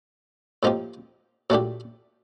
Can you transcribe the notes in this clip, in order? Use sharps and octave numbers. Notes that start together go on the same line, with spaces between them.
A2 F3 A#3 D#4 G4
A#2 F#3 A3 D4 G4